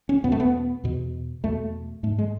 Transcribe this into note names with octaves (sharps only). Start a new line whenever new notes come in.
C#4
E2 B2 B3
A3
B3
E2 B2
E2 B2 A3
G#2 A3
G#3